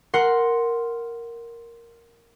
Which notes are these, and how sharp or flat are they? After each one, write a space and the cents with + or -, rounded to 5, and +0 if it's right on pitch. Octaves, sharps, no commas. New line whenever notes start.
A#4 +0 F#5 +0 C6 +0